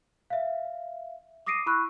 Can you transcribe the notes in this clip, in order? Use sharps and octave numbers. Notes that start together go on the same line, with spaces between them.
E5 F5
D6 D#6 A#6 C7 D7 D#7
E4 B5 C#6 E6 F#6